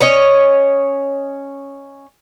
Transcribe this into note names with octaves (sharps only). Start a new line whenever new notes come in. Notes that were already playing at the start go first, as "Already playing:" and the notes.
C#4 C#5 D#5